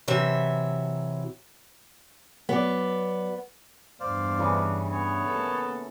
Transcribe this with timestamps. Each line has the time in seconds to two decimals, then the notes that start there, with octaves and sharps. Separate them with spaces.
0.08 C3 E3 F#3 E5
2.49 F#3 B3 D5
4.00 E2 G2 C5 D5 F5
4.39 C#3 E3 D4
4.92 B3 C#5
5.27 A#3 A4